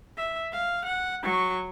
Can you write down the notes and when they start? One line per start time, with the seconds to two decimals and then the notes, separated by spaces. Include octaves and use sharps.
0.17 E5
0.52 F5
0.85 F#5
1.23 F#3 C#6